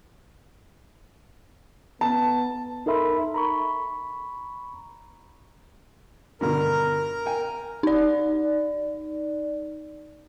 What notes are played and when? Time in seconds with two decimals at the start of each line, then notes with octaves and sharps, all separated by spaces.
2.01 B3 A5
2.86 D#4 A4 A#4 E5 B5 C6
3.34 A#5 B5 C#6
6.41 G2 B2 D3 A#4
7.26 G5 G#5
7.83 D#4 D5